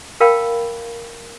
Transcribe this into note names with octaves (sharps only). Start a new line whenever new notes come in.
A#4 F5 G5 A5 B5